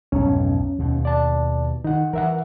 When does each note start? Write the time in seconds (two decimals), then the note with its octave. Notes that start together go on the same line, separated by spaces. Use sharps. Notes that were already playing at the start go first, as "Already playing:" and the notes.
0.12 B1 F2 G#2 C#4
0.79 D#2 B2
1.05 D5 A5
1.84 D#3 D#4 F#5
2.13 E3 A#4 E5 F#5